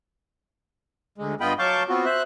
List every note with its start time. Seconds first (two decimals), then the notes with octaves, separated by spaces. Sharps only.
1.18 D2 G#3
1.40 G2 B3 F4 D#5 G5 B5
1.59 F#3 F5 A5 C#6 D6 G6
1.89 B3 C4 F4 F#4
2.05 C5 E5 F#6